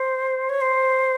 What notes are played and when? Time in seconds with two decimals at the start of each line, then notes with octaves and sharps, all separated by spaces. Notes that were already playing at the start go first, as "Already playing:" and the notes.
Already playing: C5
0.49 C#5
0.61 C5